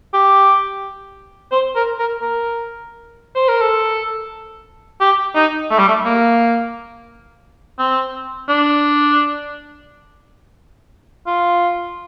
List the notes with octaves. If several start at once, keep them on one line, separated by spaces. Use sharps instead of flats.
G4
C5
A#4
A#4
A#4
C5
A#4
A4
G4
D#4
A3
G3
A3
A#3
C4
D4
F4